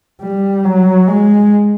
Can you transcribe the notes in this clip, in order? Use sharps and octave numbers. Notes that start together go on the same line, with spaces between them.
G3
F#3
G#3